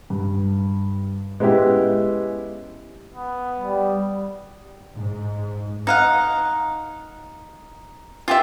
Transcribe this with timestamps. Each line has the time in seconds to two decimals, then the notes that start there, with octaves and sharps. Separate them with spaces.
0.10 G2
1.40 G#3 B3 C#4 E4 G4
3.14 B3
3.60 G3
4.94 G#2
5.87 D#4 F5 F#5
8.28 F4 G4 E5